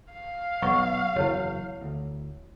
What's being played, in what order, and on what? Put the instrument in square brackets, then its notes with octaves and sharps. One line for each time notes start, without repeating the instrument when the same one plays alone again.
[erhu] F5
[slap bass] B1 [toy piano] F#5 C#6 E6
[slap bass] F#1 E2 [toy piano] E4 C#5
[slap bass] D2